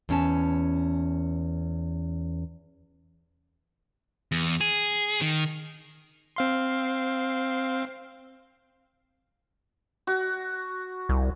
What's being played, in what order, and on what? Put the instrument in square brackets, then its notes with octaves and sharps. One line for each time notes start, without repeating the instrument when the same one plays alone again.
[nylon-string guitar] E2 C#4 A5
[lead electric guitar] E2
G#4
D#3
[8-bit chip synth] C4 F5 C6
[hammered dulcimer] F#4
[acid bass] C2